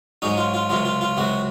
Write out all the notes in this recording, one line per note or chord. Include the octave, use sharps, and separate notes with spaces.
G#2 F#3 C#4 D#4
F4
F4
C#2 C3 F#3 F4
F4
F4
C#2 C3 F#3 F#4